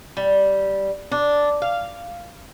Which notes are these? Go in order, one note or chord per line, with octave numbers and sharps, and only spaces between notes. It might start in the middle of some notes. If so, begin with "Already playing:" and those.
G3
D4
F5